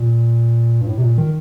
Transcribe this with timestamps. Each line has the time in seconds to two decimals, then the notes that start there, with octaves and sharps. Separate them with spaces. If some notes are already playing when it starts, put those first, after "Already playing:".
Already playing: A#2
0.81 G2
0.87 A2
0.98 C3
1.02 A#2
1.18 D#3